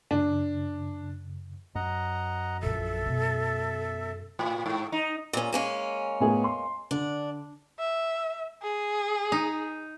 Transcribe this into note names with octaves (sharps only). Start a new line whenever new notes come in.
F#2 C#3 D4
F#2 D#5 F#5 A#5
A#1 A#2 A4 E5
B2
A2
G#2
D#4
A#2 C#4
G#3 A#3 C#4
A2 B3 G#4
C6
D3 D4
E5
G#4
D#4